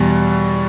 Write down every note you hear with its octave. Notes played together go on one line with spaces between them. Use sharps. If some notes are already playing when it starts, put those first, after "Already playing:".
Already playing: E2 B2 G3